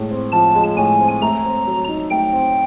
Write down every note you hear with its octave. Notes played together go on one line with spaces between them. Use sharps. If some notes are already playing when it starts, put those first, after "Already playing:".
Already playing: A2 G#3
C4
F3 A5
G#3
A2 G#5
C4
A3 A#5
C4
F#3
D#4
A3 G5
C4